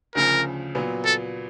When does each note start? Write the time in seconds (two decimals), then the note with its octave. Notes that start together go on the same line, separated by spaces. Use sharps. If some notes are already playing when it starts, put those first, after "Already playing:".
0.15 D2 C#3 F3 A#4
0.75 A#2 F#3 B3
1.05 A4